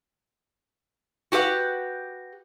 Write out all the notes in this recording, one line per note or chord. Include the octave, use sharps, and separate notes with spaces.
F#4 G4 B4 D#5 F#5